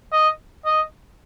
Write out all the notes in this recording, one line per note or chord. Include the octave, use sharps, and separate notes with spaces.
D#5
D#5